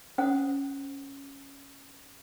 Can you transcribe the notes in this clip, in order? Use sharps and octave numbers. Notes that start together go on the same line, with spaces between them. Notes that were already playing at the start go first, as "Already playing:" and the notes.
C#4 C5 F#5 D#6